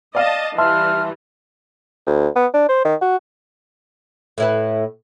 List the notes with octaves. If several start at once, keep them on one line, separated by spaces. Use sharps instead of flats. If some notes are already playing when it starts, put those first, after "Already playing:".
D5 D#5 F5 A5
E3 G3 E5 A5 C6 F6
D2
B3
D4
C5
D#3
F#4
A2 E4 B4